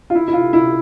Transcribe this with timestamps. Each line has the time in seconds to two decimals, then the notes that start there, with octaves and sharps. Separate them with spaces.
0.10 F4
0.15 E4
0.28 E4
0.33 F4
0.53 E4